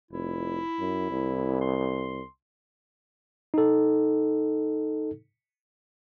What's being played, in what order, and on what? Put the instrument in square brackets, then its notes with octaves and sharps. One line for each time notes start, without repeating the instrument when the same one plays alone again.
[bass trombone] F1 [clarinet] E4
[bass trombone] F#2
C2
[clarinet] C6
[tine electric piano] D#4 A4